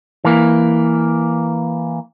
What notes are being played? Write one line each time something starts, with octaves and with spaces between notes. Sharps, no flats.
E3 A#3